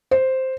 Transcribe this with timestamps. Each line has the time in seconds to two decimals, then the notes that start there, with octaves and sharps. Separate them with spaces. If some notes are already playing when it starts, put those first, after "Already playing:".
0.11 C5